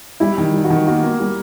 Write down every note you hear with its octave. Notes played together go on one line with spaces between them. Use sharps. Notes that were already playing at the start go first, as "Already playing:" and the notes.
G3 E4
D#3
G3
F#4
D#3
A#3 F#4
A#3
G3